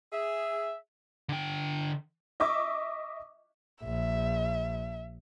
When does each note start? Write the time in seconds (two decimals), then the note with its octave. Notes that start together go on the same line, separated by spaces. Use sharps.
0.13 G#4 E5
1.29 D3 G5
2.40 D#5 E5 C#6 D6 E6
3.84 A#1 E5